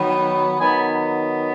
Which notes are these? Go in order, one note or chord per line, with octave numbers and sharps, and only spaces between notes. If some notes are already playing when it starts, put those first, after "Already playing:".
Already playing: D#3 F#3 B3
D#3 F#3 B3 G#5 B5